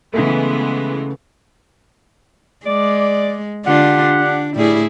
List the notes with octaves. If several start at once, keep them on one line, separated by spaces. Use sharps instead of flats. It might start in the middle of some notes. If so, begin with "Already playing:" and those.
C#3 E3 G#3 A3 B3
G#3 D5
D3 D4 F4 G4 F#5
D4
A2 G3 E4 G#4